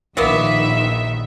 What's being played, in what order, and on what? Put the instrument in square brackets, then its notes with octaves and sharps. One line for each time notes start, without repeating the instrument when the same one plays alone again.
[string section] A#1 D#3 E5 [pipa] F#3 A#3 B3